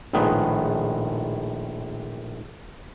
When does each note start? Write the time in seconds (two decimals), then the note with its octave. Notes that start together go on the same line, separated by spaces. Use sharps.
0.13 A#1 A2 D#3 G#3 B3